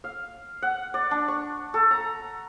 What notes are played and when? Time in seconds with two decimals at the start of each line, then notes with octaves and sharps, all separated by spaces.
0.04 F5
0.62 F#5
0.94 D5
1.11 D4
1.28 C#6
1.74 A4
1.91 A#5